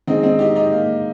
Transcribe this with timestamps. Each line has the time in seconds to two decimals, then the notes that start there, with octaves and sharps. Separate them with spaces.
0.07 D#3 G#3 C4 D4 D#4 G#4
0.23 C4 D#4
0.39 D#4 G4
0.55 D#4 G4
0.72 A#3